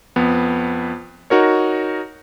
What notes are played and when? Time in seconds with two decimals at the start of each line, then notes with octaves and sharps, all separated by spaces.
0.16 F2 B3
1.30 D#4 F#4 A#4 C#5